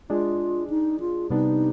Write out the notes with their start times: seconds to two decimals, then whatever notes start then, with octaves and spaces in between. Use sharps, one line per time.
0.10 G#3 D4 F4 G#4
0.70 D#4
1.00 F4
1.30 C3 G3 B3 D4 D#4